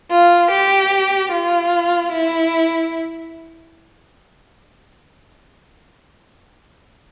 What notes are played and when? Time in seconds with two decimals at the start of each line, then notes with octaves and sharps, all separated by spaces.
0.11 F4
0.50 G4
1.32 F4
2.12 E4